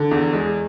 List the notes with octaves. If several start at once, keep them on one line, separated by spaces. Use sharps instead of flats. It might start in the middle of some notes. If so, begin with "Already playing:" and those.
Already playing: D3
E2
G#3